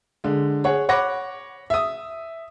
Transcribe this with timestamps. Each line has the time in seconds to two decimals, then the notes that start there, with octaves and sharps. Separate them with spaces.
0.24 D3 G#3
0.64 G#4 C#5 F#5
0.89 C#5 F#5 B5 D6 A#6
1.70 E5 D#6